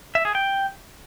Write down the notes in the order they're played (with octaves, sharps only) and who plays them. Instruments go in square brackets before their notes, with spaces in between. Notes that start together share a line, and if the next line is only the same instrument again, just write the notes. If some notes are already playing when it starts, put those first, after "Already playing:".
[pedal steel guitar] E5
G#4
G5